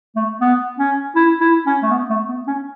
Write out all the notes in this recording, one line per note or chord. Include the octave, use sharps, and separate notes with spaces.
A3
B3
C#4
E4
E4
C#4
A3
B3
A3
B3
C#4